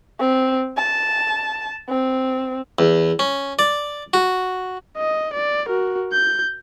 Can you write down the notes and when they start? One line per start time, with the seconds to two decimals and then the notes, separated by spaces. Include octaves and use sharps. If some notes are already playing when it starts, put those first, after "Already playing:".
0.20 C4
0.77 A5
1.89 C4
2.79 E2
3.19 C#4
3.59 D5
4.13 F#4
4.97 D#5
5.34 D5
5.67 F#4 A#4
6.12 G6